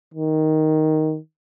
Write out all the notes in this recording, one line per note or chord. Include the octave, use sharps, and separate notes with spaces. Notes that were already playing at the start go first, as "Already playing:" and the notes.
D#3